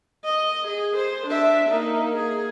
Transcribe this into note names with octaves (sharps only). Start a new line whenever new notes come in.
D#5
G#4
C5
D4 E5
A#3 D#4
G#4